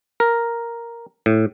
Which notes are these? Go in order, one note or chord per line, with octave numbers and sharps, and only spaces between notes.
A#4
A2